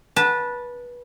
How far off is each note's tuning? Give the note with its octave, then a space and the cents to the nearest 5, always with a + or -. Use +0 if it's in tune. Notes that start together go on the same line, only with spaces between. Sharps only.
B4 -20 A5 +0